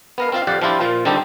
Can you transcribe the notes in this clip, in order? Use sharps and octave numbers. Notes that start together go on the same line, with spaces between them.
B3 A#4 F5
C4 F4 F5
F2 G4 D5 F5 F#5
F3 D4 E4 F4 G4
A#2 F3 F4
D3 G3 C4 D#4 G4 A4